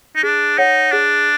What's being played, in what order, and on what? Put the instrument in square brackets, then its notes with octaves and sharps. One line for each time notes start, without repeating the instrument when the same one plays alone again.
[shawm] D#4
[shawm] D4 [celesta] G#4
[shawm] D#4 [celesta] C#5 F#5
[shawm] D4 [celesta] G#4